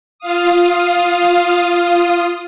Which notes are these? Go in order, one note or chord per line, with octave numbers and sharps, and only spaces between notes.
F4 F5 D#6